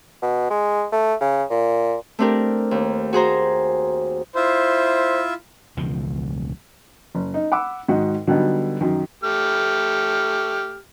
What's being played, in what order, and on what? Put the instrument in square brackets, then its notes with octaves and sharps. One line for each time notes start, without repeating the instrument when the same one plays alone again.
[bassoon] B2
G#3
A3
C#3
A#2
[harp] A3 C4 D4 G4 A#4
D#2
F#4 G#4 C5 A#5
[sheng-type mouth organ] E4 F4 E5 [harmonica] C5
[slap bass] E1 C#2 F3 G#3
[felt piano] F#1
D#4
F#5 B5 D6 E6
G#2 D#3 F#4 D#5
D3 F#3 G3 B3 D#4 F#4
F#2 D#3
[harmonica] A3 G4 F6